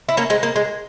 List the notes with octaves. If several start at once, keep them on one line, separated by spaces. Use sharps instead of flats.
E4
A#3 C#4
G#3 C4
A#3
G#3